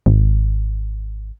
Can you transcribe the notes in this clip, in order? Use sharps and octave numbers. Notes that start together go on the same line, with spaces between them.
G#1